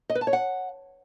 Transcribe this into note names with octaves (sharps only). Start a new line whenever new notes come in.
D#5
B4
A5
C#5
F#5